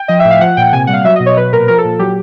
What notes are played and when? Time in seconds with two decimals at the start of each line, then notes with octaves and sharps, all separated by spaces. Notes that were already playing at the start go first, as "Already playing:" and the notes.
Already playing: G5
0.08 F3 D#5
0.19 E5
0.25 A2
0.31 F5
0.41 F3 F#5
0.57 A#2 G5
0.73 C3 G#5
0.87 G3 F#5
0.93 F5
1.05 F#3 E5
1.16 B2 D#5
1.26 C#5
1.36 F#3 B4
1.53 A#2 A#4
1.68 F3 A#4
1.78 A4
1.85 A#2
1.99 F#3 G4